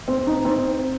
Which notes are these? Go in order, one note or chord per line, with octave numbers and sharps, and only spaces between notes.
C4
D#4
C4